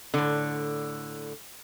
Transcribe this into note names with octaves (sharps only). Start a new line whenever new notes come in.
A2 D3